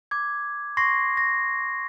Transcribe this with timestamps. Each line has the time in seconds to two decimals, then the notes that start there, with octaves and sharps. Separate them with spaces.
0.11 D6 G#6
0.77 C6 C#6 A#6 C7
1.17 A#6